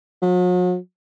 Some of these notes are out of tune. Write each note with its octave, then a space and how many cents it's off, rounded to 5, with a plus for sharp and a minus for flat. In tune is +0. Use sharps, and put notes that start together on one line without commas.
F#3 -45